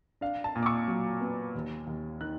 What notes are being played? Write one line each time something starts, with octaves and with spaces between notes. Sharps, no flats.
D4 F5
A5
A#2
D6
C#6
F#3
B3
D#2
D#2
D#3 F#6